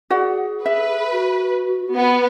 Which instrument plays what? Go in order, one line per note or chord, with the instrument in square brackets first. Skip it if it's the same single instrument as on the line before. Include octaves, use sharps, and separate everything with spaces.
[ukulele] F#4 D5 F#5 [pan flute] G#4
[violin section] B4 [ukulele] E5
[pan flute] F#4
[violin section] B3 [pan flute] F#5